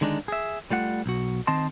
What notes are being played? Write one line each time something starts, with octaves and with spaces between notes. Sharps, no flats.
D3 D#3 G#3 D4 D#4
G#4 E5
G3 A3 F4 F#5
B1 F#4
D#3 C4 D#5 A5 C6